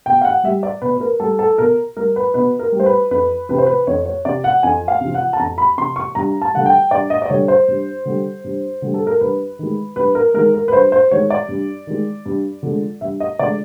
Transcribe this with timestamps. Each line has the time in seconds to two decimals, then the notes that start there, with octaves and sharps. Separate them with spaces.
0.06 B2 G5
0.21 F5
0.24 F#5
0.44 G3 E5
0.63 D5
0.82 B2 B4
0.97 B4
1.01 A#4
1.20 G3 A4
1.39 A4
1.58 B2 A#4
1.97 G3 A#4
2.16 B4
2.34 B2 B4
2.59 A#4
2.72 G3
2.80 C5
2.86 B4
3.11 F2 B4
3.49 C3 F3 B4
3.58 C5
3.66 B4
3.87 F2 C#5
4.06 C#5
4.25 C3 F3 D5
4.44 F#5
4.63 F2 G#5
4.88 F5
5.01 C3
5.06 F3
5.14 F#5
5.33 A5
5.39 F2 A#5
5.58 B5
5.78 C3 F3 C6
5.96 C#6
6.15 G2 A#5
6.42 A5
6.54 D3 G3 F#5
6.66 G5
6.91 G2 D5
7.10 D#5
7.22 D5
7.30 D3 G3 C#5
7.48 C5
7.68 G2
8.05 D3 G3
8.44 G2
8.82 D3 G3
8.94 A4
9.07 A#4
9.21 G2 B4
9.59 D#3 G#3
9.96 G2 B4
10.15 A#4
10.34 D#3 G#3 A#4
10.54 A#4
10.68 B4
10.72 G2 C5
10.92 C5
11.11 D#3 G#3 C#5
11.30 D5
11.49 G2
11.87 D#3 G#3
12.26 G2
12.63 D3 F3 G#3
13.01 G2 E5
13.20 D#5
13.39 D3 F3 G#3 D5